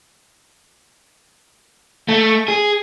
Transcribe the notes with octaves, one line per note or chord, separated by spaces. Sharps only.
A3
G#4